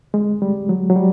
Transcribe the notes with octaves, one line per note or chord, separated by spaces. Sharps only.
G#3
G3
F#3
F#3
G3